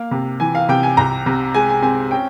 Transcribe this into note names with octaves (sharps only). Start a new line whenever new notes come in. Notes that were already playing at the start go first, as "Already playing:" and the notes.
Already playing: A#3 F5
C3
E3 G#5
F5
C3 G5
G#5
C2 A#5
C3
G#3 G#5
G#5
C4 G#5
C#4 G5